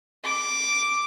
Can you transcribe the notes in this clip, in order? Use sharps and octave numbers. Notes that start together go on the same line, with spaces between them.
D6